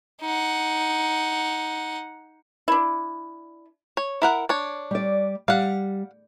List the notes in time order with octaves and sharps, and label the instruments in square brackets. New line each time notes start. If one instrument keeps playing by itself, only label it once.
[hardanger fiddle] D#4 F#5
[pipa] D4 E4
[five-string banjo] C#5
E4 A#4 F#5
D4 C#5
[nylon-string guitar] G3 D5
[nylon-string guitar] G3 [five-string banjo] F5 F#5